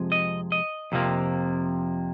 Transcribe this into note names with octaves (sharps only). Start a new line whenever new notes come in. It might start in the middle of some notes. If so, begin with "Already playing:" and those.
Already playing: F2 C3 F3 G#3
D#5
D#5
F2 C3 F3 A#3